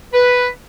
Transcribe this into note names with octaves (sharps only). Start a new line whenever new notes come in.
B4